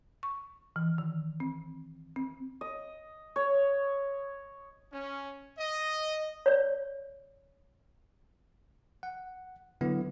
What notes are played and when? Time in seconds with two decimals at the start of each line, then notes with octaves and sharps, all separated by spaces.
0.23 C#6
0.76 E3
0.98 D#3
1.40 C4
2.16 C4
2.61 D#5
3.36 C#5
4.92 C#4
5.58 D#5
6.46 C#5 D5
9.03 F#5
9.81 D3 F#3 B3 E4